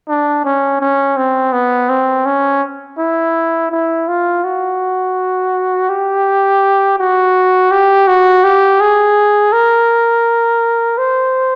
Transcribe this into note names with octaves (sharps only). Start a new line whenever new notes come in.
D4
C#4
C#4
C4
B3
C4
C#4
E4
E4
F4
F#4
G4
F#4
G4
F#4
G4
G#4
A#4
C5